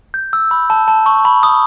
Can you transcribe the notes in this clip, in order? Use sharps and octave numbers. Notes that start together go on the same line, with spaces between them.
G6
E6
B5
A5
A5
C#6
B5
D#6